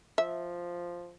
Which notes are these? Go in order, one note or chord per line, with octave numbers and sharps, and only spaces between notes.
F3 E5